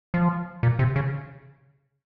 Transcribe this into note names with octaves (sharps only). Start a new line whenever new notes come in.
F3
A#2
C3
C#3